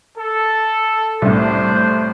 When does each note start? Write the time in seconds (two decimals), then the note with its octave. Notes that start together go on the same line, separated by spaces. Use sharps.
0.16 A4
1.22 C2 A2 A3 D4 C5